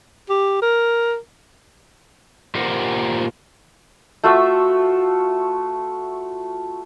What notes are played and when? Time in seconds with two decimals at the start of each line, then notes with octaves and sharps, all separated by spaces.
0.30 G4
0.62 A#4
2.55 A#2 G4 A#4 C5 F#5
4.24 A3 F4 F#4 E5